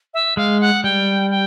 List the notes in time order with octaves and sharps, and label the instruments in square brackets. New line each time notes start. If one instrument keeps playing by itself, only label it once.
[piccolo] E5
[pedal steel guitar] G#3 [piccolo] F5
[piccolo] F#5
[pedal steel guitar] G3 [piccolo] G5
[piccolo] G5